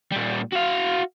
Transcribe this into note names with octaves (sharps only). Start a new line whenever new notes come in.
A#2 G3
F#4 F5